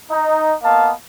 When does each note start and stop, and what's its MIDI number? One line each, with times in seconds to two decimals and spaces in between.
0.11 0.54 63
0.11 0.54 75
0.63 0.93 58
0.63 0.93 59
0.63 0.93 75
0.63 0.93 77
0.63 0.93 81